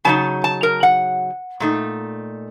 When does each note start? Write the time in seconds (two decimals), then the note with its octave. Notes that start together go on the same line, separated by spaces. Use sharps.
0.04 C#3 F#3 A#3 D#4 A5
0.44 A5
0.63 A#4
0.83 F#5
1.60 A#2 A3 D#4